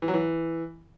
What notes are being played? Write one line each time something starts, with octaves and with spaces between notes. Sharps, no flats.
E3
F#3
E3